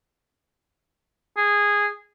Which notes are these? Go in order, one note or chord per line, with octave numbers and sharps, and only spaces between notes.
G#4